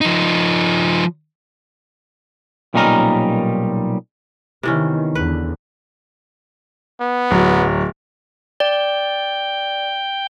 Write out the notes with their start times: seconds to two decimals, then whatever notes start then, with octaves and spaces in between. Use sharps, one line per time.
0.01 F3 D#4
2.74 B1 A#2 G3 C#4 D#4 A#4
4.63 C3 D#3 E3 B3 C#4
5.15 E2 D3 B4
7.01 B3
7.31 D1 F#3
8.60 D5 G5